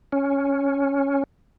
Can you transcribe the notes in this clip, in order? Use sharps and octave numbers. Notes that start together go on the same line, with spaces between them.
C#4